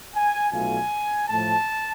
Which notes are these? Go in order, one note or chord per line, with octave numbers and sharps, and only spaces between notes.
G#5
B1 B2 A3 F4 G#5
A2 F3 A3 A5